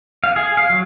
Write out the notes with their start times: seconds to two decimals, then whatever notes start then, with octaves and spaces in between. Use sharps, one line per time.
0.24 F5
0.36 G#4
0.57 F5
0.70 F#3